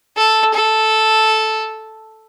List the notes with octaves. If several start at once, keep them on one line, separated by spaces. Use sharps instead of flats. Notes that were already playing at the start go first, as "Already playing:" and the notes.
A4
A4